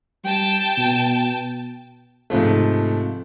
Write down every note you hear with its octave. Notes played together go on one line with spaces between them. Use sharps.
G3 G5 A5
B2
G#2 C3 F3 A3